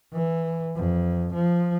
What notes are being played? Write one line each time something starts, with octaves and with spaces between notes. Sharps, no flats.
E3
F2
F3